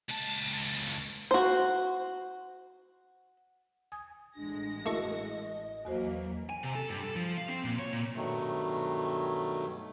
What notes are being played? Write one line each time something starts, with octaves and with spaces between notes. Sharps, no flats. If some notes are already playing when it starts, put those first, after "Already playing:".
C#2 A5
F#4 C5
G#5 D#6 G#6
A1 G#3 D4 A#6
A3 E4 F#4 A#4 D#5 C#6
E2 E3 F#3 A#3 F#4 C5
G#5
C3
A4
G2
A4
F3
F5
C4
A#2
C#5
A#2
G2 B2 D#3 F#3 A3